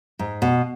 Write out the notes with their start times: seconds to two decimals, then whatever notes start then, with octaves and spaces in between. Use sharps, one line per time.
0.19 G#2
0.42 B2